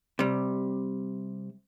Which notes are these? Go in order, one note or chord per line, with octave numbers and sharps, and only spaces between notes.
C3 G3